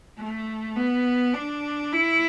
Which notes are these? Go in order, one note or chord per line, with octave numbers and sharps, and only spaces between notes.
A3
B3
D4
E4